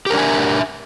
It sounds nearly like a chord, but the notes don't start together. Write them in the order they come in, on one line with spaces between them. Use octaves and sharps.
G4 A#4 D4 G#5 E5